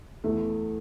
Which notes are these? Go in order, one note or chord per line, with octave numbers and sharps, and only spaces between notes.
E2 E3 A3